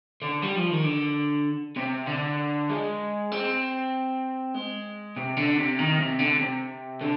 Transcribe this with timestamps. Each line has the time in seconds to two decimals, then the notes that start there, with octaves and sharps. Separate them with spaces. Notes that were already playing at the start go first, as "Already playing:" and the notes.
0.22 D3
0.42 G3
0.56 F3
0.70 D#3
0.84 D3
1.77 C3
2.07 D3
2.69 G#3
3.32 C4
4.54 G#3
5.16 C3
5.37 D3
5.58 C3
5.79 D#3
5.99 C3
6.19 D3
6.39 C3
7.01 D3